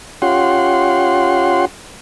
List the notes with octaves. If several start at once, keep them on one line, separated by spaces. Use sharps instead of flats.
C#4 F4 G4 F#5 C6